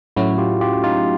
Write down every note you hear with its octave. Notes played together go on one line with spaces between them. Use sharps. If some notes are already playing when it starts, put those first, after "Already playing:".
A2 F#3 A3 C#4 E4 F#4
F4 G4
F4 G4
D#4 F4